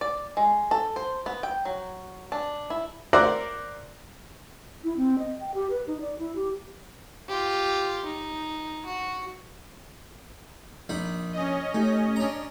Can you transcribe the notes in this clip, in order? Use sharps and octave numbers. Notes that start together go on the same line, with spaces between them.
D5
G#3
A4
C5
B3
G5
F#3
D4
E4
A#4 C5 D5 E5 F#5 A#5
E4
C4
D#5
G5
G4
B4
D#4
D5
E4
G4
F4 G4
D#4
F#4
A#1 D#4 B5
C#4 D#5
A3 D#4 G4
D4 A#5